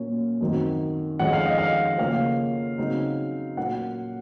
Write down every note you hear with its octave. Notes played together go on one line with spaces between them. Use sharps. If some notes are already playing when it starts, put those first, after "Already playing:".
Already playing: A#2 F#3 A#3 C#4
F#2 D#3 F#3 C4
F2 D#3 G#3 C#4 F#5
F5
D#5
F5
C#3 F3 A#3 C#4 F5
C#3 F#3 C4 D#4
A#2 F#3 A#3 C#4 F#5